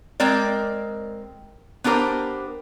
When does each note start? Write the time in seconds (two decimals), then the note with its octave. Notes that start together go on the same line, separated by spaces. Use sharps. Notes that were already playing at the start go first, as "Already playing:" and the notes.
0.20 G#3 C4 A#4 D5
1.84 B3 D4 G4 A#4 C5